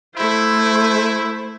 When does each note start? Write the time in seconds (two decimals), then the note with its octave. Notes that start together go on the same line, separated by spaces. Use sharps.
0.15 A3 E4 C5